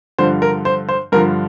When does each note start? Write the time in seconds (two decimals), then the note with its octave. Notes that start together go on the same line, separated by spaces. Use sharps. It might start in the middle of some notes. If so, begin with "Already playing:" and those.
0.18 G2 D3 F3 C5
0.42 A#4
0.65 C5
0.89 C5
1.12 G2 D3 F3 A#4